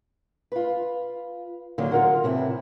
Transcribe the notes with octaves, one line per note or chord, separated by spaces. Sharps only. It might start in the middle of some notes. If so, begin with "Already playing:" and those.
F4 B4
D3 D#3 F#3 A#3
F4 A#4 F#5
A2 C3 E3 E4